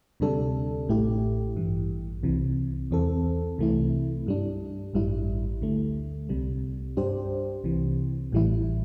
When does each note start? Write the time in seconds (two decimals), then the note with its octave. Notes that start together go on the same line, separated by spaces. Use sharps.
0.20 D2 C3 G3 D4 A4
0.88 A1 A2 A3 E4 G4
1.56 A1 G2 E3
2.23 C2 C3 E3
2.91 E2 E3 C4 A4
3.58 C2 C3 E3 A3 E4
4.27 G2 G3 D4
4.93 A1 G2 G3 E4
5.61 D2 D3 A3
6.29 C2 C3 G3
6.97 G2 G3 D4 G4 C5
7.64 C2 C3 E3
8.32 A1 A2 E3 G3 E4